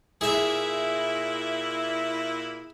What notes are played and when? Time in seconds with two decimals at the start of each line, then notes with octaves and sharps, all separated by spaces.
0.21 A#2 E4 G#4 E5